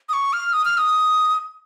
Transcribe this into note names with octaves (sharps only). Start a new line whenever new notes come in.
D#6
C#6
F6
D#6
F6
D#6